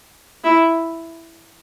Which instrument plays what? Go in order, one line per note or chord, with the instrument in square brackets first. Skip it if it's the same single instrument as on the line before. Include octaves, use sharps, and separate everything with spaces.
[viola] E4